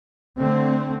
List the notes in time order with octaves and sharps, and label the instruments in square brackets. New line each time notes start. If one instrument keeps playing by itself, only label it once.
[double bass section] D3 A3 C4